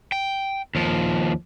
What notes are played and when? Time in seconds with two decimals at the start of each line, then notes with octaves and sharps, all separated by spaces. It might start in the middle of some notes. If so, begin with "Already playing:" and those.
0.12 G5
0.75 D#2 F3